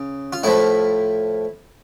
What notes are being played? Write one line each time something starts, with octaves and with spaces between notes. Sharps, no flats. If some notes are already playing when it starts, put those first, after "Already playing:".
Already playing: C#3
F4
A2 F3 E4